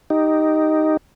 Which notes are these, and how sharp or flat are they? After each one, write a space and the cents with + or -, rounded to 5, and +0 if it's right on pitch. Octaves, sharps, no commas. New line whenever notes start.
D#4 +0 G4 -5